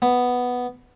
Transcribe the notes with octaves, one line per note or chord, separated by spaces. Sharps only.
B3